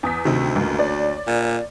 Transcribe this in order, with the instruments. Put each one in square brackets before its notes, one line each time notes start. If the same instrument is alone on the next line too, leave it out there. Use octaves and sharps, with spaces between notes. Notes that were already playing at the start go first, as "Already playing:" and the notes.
[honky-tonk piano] E2 D#6 B6
[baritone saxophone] D2 [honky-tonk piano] C3 D#3
[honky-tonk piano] F#1 C#2
C#5 D5
[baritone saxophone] A#2